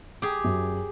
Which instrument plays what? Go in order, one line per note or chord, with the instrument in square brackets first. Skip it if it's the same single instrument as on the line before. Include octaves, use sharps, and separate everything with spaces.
[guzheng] G4 G#4
[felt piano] F#2